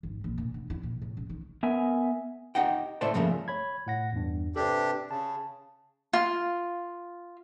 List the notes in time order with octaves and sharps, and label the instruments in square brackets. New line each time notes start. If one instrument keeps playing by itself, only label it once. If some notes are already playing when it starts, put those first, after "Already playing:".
[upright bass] G#1
A#1
A#2
D3
E4
A#2
A2
C#2
D#3
[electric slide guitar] B3 A#4 E5 G#5
[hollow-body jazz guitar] D#4 G4 D#5 F#5 G5
C#2 A2 A3 C5 D5 A5
G2 C#3 F3 A3 A#3
[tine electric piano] C#5 B5 G#6
A2 F#5 A#6
E2 G2
[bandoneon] C3 D4 G4 [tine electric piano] A4 B4
[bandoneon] C#3 [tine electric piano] A5
[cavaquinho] F4